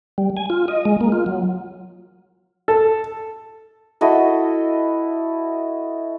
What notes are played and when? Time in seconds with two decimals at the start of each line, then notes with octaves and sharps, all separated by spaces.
0.18 G3
0.37 G#5
0.50 F4
0.68 D#5
0.85 G#3
1.01 A#3
1.12 F4
1.26 F#3
2.68 A4
4.01 E4 F#4 A4 D#5